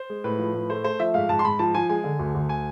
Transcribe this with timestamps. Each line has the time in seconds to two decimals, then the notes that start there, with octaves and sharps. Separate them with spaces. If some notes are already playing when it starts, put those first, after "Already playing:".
Already playing: C5
0.10 G#3
0.24 A2 B4
0.39 F3
0.54 A2
0.70 A3 C5
0.84 A3 C5
0.99 F3 E5
1.14 G#2 F5
1.29 G#2 A5
1.39 C6
1.45 G#2 B5
1.59 F3 A5
1.75 F3 G#5
1.89 G#3 G#5
2.04 D3
2.19 D2
2.35 D2
2.49 G#5